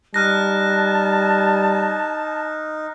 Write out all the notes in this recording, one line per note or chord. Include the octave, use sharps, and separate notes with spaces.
G3 D#4 A5 F6 F#6 A#6